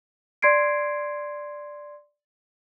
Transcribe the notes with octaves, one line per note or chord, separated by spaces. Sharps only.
D5 C6 G#6 C7 D7